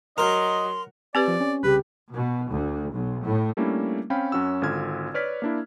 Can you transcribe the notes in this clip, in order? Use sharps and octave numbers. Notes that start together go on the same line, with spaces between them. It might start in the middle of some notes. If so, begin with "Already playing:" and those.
F#3 A#4 D#5 C6
C4 G4 B4 D5
F3
C#4
C2 C#3 G4 B4
B2
D2
B1
A2
G3 A3 A#3 C#4 D4 E4
C4 C#4 F5 G5 B5
F#2 C#4 F#4 F#5 E6
G#1 D3 D4 F4 F6 G#6
B4 C#5 D5 F6 G#6 B6
A#3 D4 E4